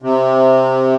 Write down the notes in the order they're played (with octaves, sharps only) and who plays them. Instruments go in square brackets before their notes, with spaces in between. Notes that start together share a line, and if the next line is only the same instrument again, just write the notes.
[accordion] C3